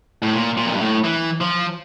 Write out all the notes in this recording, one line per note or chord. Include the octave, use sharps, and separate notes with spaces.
A2
A#2
A#2
F2
G2
A2
E3
F3